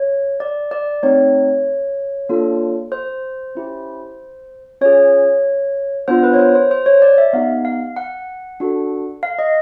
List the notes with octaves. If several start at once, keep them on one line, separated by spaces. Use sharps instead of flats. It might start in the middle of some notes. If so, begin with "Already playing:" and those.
Already playing: C#5
D5
D5
A3 C4 D#4 C#5
A#3 D4 F4 A4
C5
C#4 E4 G4
C#4 F4 G#4 C#5
B3 D4 F4 C5
B4
C#5
C5
C5
C5
C#5
D5
E5
B3 D#4 G4 F5
F5
F#5
D4 F#4 A4
F5
D#5